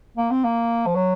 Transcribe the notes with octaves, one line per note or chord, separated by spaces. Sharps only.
A#3
C4
A#3
F3
F#3